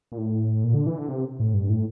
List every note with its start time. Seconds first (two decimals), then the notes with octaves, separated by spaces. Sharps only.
0.12 A#2
0.18 A2
0.64 A#2
0.74 D3
0.86 E3
0.98 D3
1.09 C3
1.40 A2
1.54 G2
1.69 A2